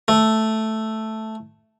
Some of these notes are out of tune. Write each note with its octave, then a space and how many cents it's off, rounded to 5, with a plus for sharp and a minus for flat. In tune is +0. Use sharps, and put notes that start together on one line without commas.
A3 +0